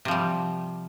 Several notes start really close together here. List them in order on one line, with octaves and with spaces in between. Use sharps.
C3 F3 G3